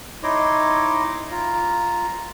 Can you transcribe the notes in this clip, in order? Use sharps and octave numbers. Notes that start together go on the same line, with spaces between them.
D#4 E4 C#5 D#5 C6 D6
F4 A#5